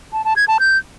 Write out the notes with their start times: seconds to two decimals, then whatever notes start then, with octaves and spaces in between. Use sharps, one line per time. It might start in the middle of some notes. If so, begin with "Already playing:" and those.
0.13 A5
0.25 A5
0.36 G#6
0.48 A5
0.60 G6